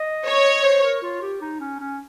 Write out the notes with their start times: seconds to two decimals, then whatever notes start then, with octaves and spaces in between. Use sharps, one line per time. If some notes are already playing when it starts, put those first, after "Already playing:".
Already playing: D#5
0.26 C#5
0.64 C5
0.83 A#4
1.02 F4
1.21 G4
1.41 D#4
1.60 C#4
1.80 C#4